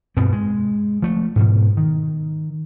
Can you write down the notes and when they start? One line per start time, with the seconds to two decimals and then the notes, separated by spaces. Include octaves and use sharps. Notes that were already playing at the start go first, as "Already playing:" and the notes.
0.17 G2 B2 B3 C4
0.32 G#3
1.02 F3 A3
1.36 G#2 B2
1.77 D#3